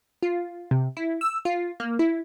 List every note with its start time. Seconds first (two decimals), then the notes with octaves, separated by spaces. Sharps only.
0.23 F4
0.71 C3
0.97 E4
1.21 E6
1.45 F4
1.80 A#3
1.99 E4